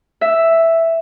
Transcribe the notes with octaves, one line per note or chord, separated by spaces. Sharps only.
E5